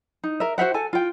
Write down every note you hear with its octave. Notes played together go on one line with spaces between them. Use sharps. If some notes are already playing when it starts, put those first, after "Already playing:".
D#4
A#4 E5
F#4 C5 E5 F#5
A4 G#5
F4 G5